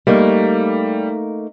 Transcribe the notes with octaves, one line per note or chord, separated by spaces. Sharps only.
G3 A3 A#3 D#4